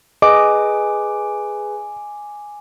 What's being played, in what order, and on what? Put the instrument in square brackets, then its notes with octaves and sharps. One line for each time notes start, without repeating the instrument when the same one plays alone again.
[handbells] G#4 B4 [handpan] D#5 [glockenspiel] G#5 [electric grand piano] D6